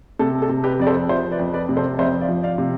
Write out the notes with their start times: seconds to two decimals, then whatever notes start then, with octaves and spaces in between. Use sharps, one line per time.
0.19 C3 A4
0.42 A4
0.49 C3
0.64 G4 B4
0.80 F2 D5
0.87 A4 C5
1.09 F3 C5 E5
1.31 B4 D5
1.39 F2
1.53 B4 D5
1.69 C3
1.76 A4 C5
1.98 F2 C5 E5
2.21 D5 F5
2.29 F3
2.43 D5 F5
2.58 C3